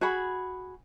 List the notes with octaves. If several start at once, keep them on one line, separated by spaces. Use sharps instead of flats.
F#4 G#4 B5